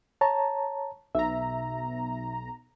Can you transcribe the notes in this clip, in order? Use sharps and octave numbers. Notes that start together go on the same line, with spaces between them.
C#5 A5 A#5
B1 E5 A#5